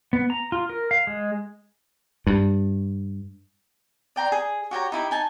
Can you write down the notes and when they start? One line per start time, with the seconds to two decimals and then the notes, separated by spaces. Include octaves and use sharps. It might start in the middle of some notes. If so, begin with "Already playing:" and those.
0.13 B3
0.30 A#5
0.52 F4
0.69 A#4
0.91 F5
1.07 G#3
2.27 G2
4.16 D5 G5 A#5 C6
4.32 G#4
4.71 F#4 G4 C#5 A#5
4.92 D#4 E4 G4
5.11 D#4 G#5 A5